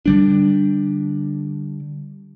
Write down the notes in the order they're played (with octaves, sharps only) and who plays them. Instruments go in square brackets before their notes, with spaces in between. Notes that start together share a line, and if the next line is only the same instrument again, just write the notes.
[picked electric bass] D3 G3 D4